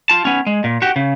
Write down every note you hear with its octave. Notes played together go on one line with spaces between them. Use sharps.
F4 A5
B3 C#4
G#3
A#2
F#4 G4
C#3